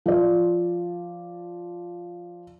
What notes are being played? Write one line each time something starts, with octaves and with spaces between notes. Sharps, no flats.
F3 D5